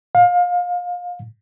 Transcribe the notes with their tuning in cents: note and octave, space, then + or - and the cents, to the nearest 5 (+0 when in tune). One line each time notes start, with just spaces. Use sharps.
F5 +25